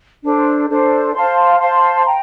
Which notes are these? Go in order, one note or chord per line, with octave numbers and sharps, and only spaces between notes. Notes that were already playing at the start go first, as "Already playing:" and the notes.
D4 A4 C5
D4 A4 C5
C5 F5 A5 C6
C5 F5 A5 C6
G5 A#5